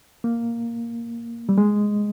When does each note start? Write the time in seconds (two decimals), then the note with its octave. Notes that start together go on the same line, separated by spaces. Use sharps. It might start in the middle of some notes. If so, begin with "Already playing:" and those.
0.24 A#3
1.49 G3
1.58 G#3